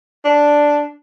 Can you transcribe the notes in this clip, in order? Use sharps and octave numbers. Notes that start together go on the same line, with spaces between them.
D4